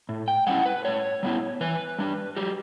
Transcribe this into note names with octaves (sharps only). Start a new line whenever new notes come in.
A2
G5
G3 C#4 E4 F#5
B4
A2 C#5
G3 B3 E4
E3 B4
G3 D4
F#3 G4